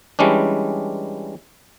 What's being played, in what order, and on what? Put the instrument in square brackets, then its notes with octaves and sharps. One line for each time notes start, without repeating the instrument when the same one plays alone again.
[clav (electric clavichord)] E3 G3 G#3 C#4 D4